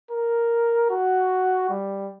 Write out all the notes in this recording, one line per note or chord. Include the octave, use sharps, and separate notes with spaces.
A#4
F#4
G3